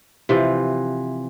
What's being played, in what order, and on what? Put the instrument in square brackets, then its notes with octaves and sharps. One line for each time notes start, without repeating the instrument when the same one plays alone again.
[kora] C3 E3 F3